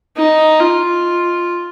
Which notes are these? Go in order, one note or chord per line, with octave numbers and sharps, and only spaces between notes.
D#4
F4